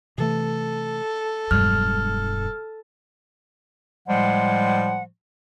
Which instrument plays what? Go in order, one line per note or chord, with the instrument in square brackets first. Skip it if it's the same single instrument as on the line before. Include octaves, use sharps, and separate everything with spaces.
[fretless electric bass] C3 E3 A3 [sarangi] A4
[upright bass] E1 G2 [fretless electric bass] F#3 G#3 [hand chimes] F6
[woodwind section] A2 F3 G3 G#3 F#5